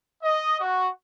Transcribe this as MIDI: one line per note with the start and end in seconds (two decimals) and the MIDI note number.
0.23 0.59 75
0.60 0.90 66